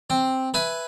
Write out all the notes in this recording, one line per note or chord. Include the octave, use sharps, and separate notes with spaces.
C4
B4 E5 G#5